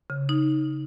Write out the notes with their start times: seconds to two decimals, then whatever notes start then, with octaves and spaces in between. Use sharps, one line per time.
0.10 C#3
0.29 D#4